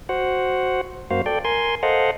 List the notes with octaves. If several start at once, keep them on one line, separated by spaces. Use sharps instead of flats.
F#4 C5 F#5
F#2 A#3 F#4 C5 F5
A4 D5 G5
A#4 G#5 C6
A4 C5 D#5 F5 F#5